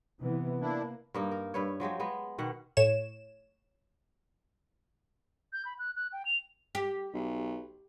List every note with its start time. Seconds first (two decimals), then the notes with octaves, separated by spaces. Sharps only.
0.20 C3 E3 B3
0.61 A#3 D4 E4
1.14 G2 A#3 D#4
1.31 A#4
1.54 G2 B4 C#5
1.80 F3 F#3 G#3 G4
2.00 G#3 B3
2.38 B2 D#3 F#5
2.77 A2 C#5 E7
5.53 G6
5.65 B5
5.79 F#6
5.96 F#6
6.13 G5
6.26 F7
6.75 G4
7.13 B1